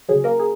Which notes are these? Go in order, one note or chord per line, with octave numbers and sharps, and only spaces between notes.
C#2 C#3 F#3 G#4
A#3 A#4
G#4